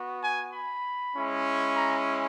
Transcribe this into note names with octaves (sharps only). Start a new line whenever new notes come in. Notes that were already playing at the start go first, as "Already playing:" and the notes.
Already playing: B3 F#4
G#5
B5
G#3 C#4 E4
A#5